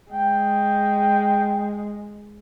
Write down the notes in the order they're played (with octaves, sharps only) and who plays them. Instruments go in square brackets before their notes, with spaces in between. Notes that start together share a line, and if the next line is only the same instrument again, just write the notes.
[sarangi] G#3 [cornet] G5